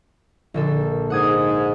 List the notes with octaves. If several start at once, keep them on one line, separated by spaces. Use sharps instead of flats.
A#1 D3 A4
G#2 F#5 D#6 G#6